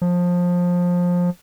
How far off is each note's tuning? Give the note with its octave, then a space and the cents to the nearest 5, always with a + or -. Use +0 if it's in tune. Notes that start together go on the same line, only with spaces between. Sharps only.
F3 +20